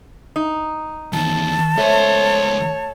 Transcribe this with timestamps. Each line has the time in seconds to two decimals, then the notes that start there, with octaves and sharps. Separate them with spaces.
0.36 D#4
1.13 E2 D#3 A5
1.78 C#2 A3 C5 C#5